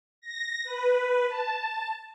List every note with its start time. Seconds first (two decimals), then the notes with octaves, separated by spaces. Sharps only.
0.21 A#6
0.64 B4
1.28 A5